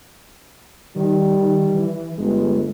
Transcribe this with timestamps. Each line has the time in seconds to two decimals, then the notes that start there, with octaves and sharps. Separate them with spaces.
0.96 D#3 G3
1.75 E3
2.18 G1 G#3